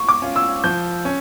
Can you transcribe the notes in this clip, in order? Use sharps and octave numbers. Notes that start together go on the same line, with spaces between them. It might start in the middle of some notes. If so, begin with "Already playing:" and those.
Already playing: C#6
D6
C#4 F4
E6
F3 G6
C#4